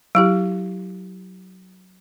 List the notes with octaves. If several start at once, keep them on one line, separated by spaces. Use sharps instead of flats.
F#3 E4 G4